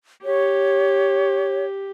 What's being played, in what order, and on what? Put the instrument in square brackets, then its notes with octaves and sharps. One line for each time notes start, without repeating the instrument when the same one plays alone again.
[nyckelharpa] G4 [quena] C#5